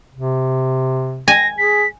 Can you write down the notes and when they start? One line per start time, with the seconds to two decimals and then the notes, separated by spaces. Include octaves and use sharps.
0.14 C3
1.28 G#5 A#6
1.58 G#4 B6